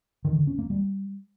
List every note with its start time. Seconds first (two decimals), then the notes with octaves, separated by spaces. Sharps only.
0.25 D#3
0.36 D3
0.47 C#4
0.59 A#3
0.70 G3